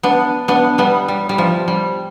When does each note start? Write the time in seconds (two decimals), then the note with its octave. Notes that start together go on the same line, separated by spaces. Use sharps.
0.03 B3 D4
0.48 B3 D4
0.78 G3 B3
1.08 G3
1.29 G3
1.38 F3
1.68 G3